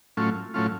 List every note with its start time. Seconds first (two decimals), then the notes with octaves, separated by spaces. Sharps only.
0.17 A2 F#3 A3 C#4 F4
0.54 A2 F#3 A3 C#4 F4